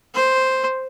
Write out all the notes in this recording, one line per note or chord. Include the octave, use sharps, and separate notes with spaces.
C5